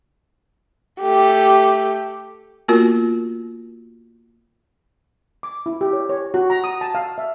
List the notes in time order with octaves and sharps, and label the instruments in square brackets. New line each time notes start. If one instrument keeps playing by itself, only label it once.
[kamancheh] A3 G4
[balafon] A#3 B3 F4 F#4 A#4
[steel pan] D6
E4
G4
C#5
C#5
F#4
A#5
D#6
A5
F5
E5